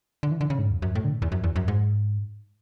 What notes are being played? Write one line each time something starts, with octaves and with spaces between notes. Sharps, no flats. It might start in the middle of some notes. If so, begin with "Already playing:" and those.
D3
E3
D3
C#3
G#2
E2
F#2
A2
D3
A2
E2
F#2
E2
F#2
G#2